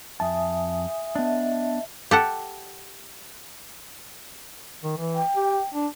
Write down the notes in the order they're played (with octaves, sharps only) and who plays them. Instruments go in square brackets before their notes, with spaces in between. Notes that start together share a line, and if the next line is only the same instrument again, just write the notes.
[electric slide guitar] F2 A5 [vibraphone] E5 G#5 D#6
[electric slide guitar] B3 D4 [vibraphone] D#5 E5 A5
[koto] G4 A4 F#5
[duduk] D#3
E3
[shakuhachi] G5
[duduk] G4
D4